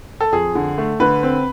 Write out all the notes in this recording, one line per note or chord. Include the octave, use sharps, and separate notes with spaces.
A4
F2 G#4
D3
A3
D3 B4
C4